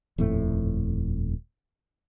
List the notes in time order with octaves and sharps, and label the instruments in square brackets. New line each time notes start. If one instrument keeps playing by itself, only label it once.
[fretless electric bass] D#1 F2 A2 A3